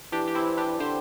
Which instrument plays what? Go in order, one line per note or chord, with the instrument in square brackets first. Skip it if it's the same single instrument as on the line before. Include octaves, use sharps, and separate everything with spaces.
[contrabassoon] E3 [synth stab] D4 G4
[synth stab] G4
C4 E4
D4 G4
[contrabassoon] D3 [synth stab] G4 C5